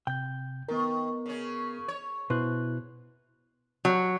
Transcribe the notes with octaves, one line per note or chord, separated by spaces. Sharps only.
C3 G5 G6
D#3 B3 A#4
C#3 C#4
C#5
B2 E4 B4 C5 F#6
F#3